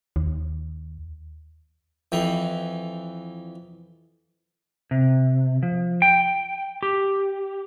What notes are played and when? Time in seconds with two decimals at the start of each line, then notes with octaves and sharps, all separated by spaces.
0.16 D#2
2.12 F2 E3 G5
4.91 C3
5.63 F3
6.02 G5
6.83 G4